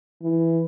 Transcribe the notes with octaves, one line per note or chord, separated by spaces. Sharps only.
E3